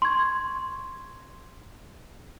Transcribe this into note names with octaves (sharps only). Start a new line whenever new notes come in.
C6 C#6 G#6